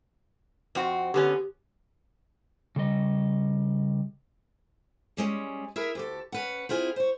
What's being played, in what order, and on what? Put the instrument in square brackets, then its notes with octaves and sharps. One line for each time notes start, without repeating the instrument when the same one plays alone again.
[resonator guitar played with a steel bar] F2 C4 F#4
[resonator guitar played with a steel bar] D3 B3 C#4 [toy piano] G4
[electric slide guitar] C#3 G3 D#5
[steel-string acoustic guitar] G3 G#3 C4 C#4
E4 G#4 A#4 E5
D2 G4 A4
C#4 B4 F#5
C4 E4 F4 G#4
C5 C#5